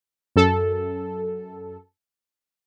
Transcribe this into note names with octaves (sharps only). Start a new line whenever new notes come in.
F#2 A4